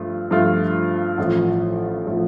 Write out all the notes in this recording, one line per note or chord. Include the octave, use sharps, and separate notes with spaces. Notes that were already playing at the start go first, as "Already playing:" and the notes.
Already playing: G2 F3 A3 F4
G2 F3 A3 F4
A1 A2 F3
A2 F3